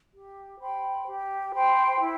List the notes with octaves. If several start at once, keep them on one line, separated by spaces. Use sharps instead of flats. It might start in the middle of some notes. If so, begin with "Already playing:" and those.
G4
C5 G5 B5
G4
C5 G5 B5
E4